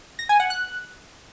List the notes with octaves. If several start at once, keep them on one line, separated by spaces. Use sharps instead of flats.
A#6
G#5
F#5
F#6